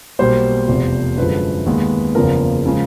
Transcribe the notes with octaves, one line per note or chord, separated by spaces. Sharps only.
B1 B2 G3 A#3 C5
F1 E2 C3 F3
F#2 D3 F3 G#3 B4
D#2 D#3 G#3 B3
F#1 E2 C#3 F3 A#4
C#3 F3 G#3